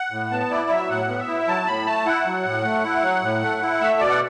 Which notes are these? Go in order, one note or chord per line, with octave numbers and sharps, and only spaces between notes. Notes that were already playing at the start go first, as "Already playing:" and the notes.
Already playing: F#5
A2
B3 A5
E4 D5
F#3 E5
A2 F#5
B3
E5
E4
F#3 A5
A2 B5
A3 A5
E4 F#5
F#3
A2
A3
E4
F#3
A2
A3
E4
A3 E5
B2 D5
F#5